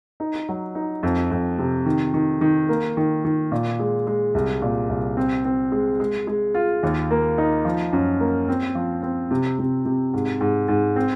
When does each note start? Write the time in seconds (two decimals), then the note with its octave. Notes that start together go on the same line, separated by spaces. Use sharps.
0.20 D#4
0.49 F#3
0.75 D#4
1.03 F2
1.31 F2
1.58 C3
1.86 D#3
2.14 D#3
2.41 D#3
2.69 A#3
2.97 D#3
3.25 D#3
3.52 A#2
3.80 G#3
4.07 G#3
4.34 C2
4.62 A#2
4.89 C2
5.17 C4
5.45 C4
5.72 G#3
6.00 G#3
6.27 G#3
6.54 F4
6.83 D#2
7.11 A#3
7.38 D#4
7.65 F3
7.93 F#2
8.20 A#3
8.48 C4
8.75 F3
9.03 C4
9.31 C3
9.59 C3
9.85 C3
10.14 G#2
10.41 G#2
10.68 G#2
10.96 C4